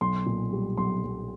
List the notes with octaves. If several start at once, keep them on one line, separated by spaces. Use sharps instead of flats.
B1 C6
A#2
G3
B1 C6
B1